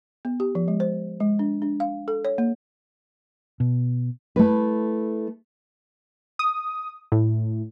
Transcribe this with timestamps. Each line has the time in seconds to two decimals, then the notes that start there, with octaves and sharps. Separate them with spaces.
0.25 B3
0.40 G4
0.55 F3
0.68 G#3
0.80 C5
1.20 G#3
1.39 D4
1.62 D4
1.80 F5
2.08 A4
2.25 C#5
2.38 A#3
3.60 B2
4.36 A3 E4 B4
6.39 D#6
7.12 A2